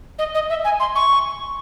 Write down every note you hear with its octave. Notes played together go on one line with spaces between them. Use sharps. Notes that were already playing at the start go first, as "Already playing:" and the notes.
D#5
D#5
E5
G#5
C6
C#6